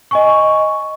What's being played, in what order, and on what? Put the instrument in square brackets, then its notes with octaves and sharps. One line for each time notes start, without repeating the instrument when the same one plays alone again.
[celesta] D#5 G#5 C#6